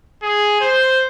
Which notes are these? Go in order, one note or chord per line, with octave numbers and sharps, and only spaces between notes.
G#4
C5